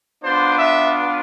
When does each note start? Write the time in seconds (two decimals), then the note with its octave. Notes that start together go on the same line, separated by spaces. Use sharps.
0.23 B3 D4 F4 C5
0.58 E5